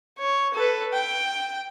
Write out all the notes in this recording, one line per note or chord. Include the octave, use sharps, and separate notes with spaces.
C#5
A4 B4
G5